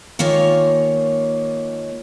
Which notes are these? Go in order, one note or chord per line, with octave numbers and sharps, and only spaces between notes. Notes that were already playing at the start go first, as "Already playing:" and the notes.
D#3 G#3 A#3 F4 C#5